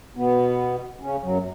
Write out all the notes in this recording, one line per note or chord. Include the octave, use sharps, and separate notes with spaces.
B2 B3
C#3 C#4
F#2 F#3